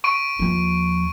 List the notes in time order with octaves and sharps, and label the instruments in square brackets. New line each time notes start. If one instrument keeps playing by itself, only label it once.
[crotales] C#6 D7
[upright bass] D#2 F3